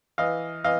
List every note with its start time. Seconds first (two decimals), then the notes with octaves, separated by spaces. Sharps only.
0.18 E3 D#5 F5
0.64 E3 D#5 F5